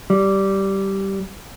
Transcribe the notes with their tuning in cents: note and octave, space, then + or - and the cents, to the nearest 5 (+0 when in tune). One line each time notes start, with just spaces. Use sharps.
G3 -10